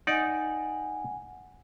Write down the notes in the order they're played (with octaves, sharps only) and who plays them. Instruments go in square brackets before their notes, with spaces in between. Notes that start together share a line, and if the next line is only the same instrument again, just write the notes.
[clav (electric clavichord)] D#4 D5 [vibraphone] F#5 G#5